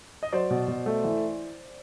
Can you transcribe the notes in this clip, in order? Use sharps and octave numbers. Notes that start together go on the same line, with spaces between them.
D#5
F#3 C5 D5
B2
B2
A3
E3